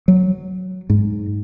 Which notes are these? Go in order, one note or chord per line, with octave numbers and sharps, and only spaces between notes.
F#3
G#2